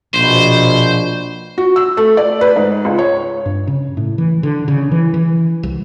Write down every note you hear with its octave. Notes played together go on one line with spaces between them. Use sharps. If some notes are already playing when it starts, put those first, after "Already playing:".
A#1 B2 C5
F#4
E6
A3
D5
B4
G#2
C#2
C#5
G2
C#3
A2
E3
D3
C#3
E3
E3
C2